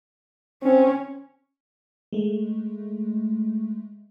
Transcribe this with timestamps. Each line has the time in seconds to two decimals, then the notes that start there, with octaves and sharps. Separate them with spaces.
0.63 C4 C#4
2.13 G#3 A3